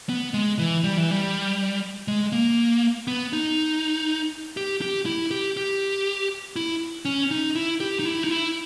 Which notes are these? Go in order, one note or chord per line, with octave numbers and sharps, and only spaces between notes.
B3
G#3
E3
G3
E3
G3
G#3
A#3
B3
D#4
G4
G4
E4
G4
G4
E4
C#4
D#4
E4
G4
D#4
E4
D#4
E4